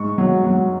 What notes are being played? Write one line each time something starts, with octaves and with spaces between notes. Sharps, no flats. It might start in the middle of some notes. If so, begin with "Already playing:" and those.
Already playing: G#2 C#6
F#3
F#3